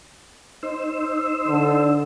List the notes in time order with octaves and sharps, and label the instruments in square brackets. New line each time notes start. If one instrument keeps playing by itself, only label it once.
[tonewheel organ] D#4 C5 E6
[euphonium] D3